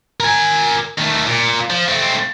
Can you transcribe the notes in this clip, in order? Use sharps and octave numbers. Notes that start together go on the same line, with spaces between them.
A#4 G#5
D#3 A3
A#2
F3
A3 C4